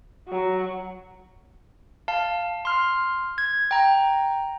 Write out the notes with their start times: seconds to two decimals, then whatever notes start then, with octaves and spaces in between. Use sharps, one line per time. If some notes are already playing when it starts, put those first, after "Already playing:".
0.29 F#3
2.08 F5 A5
2.65 C6 F6
3.38 G#6
3.71 G5 A#5